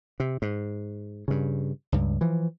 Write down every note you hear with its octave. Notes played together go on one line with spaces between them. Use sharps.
C3
G#2
G2 C#3
C#2 G2
E3 F3